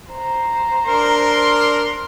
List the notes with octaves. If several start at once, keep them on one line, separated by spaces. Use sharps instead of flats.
C5 A#5
D4 A#4 C6